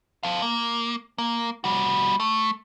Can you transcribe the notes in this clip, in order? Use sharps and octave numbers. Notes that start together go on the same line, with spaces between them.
A4 F5
A#3
A#3
G3 F#4
A3